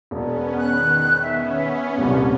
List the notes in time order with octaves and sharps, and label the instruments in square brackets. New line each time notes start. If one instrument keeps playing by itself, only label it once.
[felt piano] E1 [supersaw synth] B3 C#4
[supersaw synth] D#3 [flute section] F#6
[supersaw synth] B3 C#4 [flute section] E5
[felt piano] D#1 C2